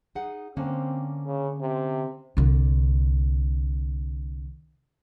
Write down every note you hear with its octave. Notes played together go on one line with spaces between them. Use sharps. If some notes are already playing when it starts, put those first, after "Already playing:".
D#4 G#4 F#5
D3 A#3 C4 C#4
C#3
C3
C2 D3